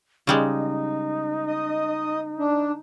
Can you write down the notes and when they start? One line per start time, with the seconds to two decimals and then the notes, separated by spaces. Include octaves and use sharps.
0.27 C#3 G3 G#3 D#4
1.47 D#5
2.39 D4